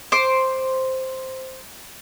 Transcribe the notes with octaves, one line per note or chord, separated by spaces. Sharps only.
C5 D6